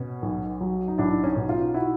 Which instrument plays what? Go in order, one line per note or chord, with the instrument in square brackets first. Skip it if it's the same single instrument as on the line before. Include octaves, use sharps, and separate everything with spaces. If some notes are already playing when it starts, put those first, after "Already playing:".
Already playing: [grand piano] B2 C#4
B1
F#3
D#4
B1 D4 E4
C#4 D#4
B2
D#4 F4
E4 F#4